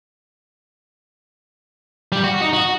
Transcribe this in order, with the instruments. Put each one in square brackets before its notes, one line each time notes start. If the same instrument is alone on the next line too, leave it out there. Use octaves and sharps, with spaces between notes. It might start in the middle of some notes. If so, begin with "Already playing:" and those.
[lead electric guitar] G3
F#4
D#4
F#4